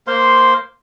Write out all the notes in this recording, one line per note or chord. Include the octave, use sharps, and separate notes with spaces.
A#3 C5 F5 C6